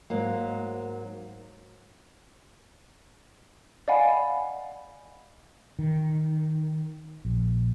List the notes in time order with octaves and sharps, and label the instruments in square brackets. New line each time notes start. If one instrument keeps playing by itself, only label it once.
[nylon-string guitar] G#2 F#3 A#3
[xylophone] D5 D#5 F5 F#5 G#5 B5
[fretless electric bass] D#3
A#1